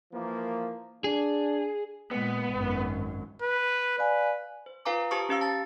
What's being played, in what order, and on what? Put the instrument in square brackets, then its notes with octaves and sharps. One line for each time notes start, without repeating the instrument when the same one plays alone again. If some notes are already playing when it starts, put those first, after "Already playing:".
[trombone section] E3 F3 A#3
[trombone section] D4 [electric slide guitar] G#4
[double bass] A#2 G#3 [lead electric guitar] B3
[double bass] G#1 F#2
[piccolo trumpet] B4
[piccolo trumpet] B4 [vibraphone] D5 F5 G#5
[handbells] C5
F4 B4 F5 G#5 A#5 D6
G4 C5 A5 A#5 C#6 D#6
C#4 G4 F5 E6
A5 A6